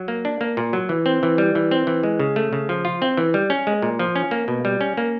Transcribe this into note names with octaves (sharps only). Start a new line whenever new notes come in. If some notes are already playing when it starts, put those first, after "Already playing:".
Already playing: F#3
A#3
D4
A#3
A#2
F#3
E3
C4
E3
G3
E3
C4
E3
G#3
C#3
A3
C#3
F3
F4
C4
E3
G3
C#4
G#3
A#2
F3
C#4
A#3
B2
G3
C#4
A#3